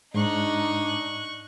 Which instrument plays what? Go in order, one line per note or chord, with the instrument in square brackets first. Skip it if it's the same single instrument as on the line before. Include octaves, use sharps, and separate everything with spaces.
[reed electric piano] G#2 [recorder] D4 [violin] D#4 [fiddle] C#6 F#6